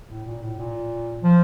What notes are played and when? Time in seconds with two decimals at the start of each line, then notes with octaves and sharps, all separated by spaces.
0.10 A2
0.26 A#2
0.42 A2
0.58 A#2
1.23 F3